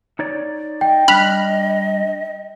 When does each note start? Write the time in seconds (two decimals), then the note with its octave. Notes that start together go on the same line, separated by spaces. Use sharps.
0.19 D#4 C#5 D5
0.81 D#5 G5
1.08 G3 D4 B5 F6 F#6